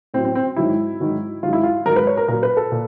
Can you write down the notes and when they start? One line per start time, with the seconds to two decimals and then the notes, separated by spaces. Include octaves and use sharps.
0.14 A2 C4
0.18 F#3
0.25 C4
0.35 C4
0.56 G#2 D#3 F#3 E4
1.00 G#2 D#3 F#3
1.43 G#2 D#3 F#3 F4
1.53 E4
1.63 F4
1.86 G#2 D#3 F#3 A#4
1.96 B4
2.07 C#5
2.17 A#4
2.28 A#2 F#3 A#4
2.43 B4
2.57 A4
2.72 A#2